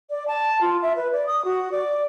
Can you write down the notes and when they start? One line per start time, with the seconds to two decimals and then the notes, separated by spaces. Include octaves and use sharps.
0.10 D5
0.28 A5
0.61 F4
0.82 E5
0.96 B4
1.12 D5
1.27 D#6
1.45 F#4
1.72 D5